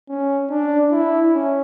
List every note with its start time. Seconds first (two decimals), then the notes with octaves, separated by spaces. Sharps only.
0.09 C#4
0.50 D4
0.92 E4
1.33 C#4